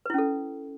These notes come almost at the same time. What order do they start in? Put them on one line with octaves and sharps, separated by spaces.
B4 E4 C#4 A4